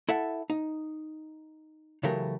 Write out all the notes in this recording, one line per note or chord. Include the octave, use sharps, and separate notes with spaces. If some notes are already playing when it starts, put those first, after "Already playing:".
E4 A4 E5 F#5
D#4
C#3 E3 F#3 A3 G4 A#4